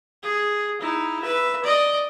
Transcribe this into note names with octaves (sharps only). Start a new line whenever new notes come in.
G#4
D#4 E4
B4 E5
D5 D#5